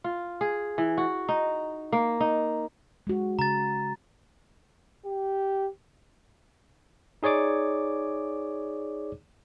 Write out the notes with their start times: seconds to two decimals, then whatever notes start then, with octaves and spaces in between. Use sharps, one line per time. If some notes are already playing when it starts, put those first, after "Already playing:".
0.04 F4
0.41 G#4
0.78 E3
0.98 F#4
1.29 D#4
1.92 A#3
2.20 D#4
3.07 G#3 F#4
3.39 C#3 A#5 A6
5.06 G4
7.23 D#4 G#4 C#5 D5 D6